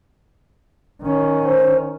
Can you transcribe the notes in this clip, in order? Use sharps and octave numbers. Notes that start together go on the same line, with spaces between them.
D#3 C#4
C5